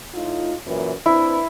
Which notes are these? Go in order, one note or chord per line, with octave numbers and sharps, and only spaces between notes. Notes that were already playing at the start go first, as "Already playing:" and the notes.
A2 D#4 F4
F#2 A#2 E3
C4 D4 E4 B4